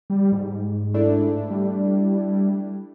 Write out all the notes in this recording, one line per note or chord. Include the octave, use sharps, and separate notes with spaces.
G3
G#2
A3 D4 E4
G3